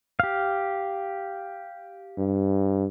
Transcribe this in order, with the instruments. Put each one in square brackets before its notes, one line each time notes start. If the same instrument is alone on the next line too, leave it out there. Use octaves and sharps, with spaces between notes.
[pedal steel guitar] G4 F5
[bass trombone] G2